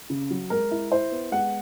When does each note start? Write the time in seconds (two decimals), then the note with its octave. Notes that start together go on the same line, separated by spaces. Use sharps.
0.10 C#3
0.30 F#3
0.50 G#3 A#4
0.71 E4
0.91 E4 C5
1.12 B3
1.32 G#3 F#5